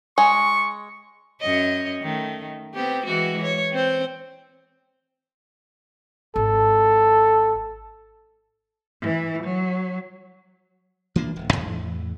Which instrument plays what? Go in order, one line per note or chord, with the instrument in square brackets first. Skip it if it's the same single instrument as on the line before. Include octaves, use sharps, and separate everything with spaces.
[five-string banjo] G#3 [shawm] C#6
[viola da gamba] F#2 C#5 D#5
D#3 A3
B3 C4 G4
E3 G#3 F#4
C#5
C4 C5
[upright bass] G#1 [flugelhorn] A4
[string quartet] E3
F#3
[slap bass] E3 A#3 D4
D1
E2 A2 E3